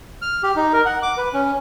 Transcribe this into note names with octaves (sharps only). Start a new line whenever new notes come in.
F6
G4
D#4
A#4
F#5
D6
B4
C#4